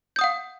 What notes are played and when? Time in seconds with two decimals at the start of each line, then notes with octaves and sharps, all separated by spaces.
0.16 G6
0.19 D#6
0.21 F#5
0.24 F5